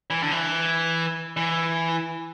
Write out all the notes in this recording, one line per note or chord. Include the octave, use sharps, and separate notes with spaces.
E3
D3
E3
E3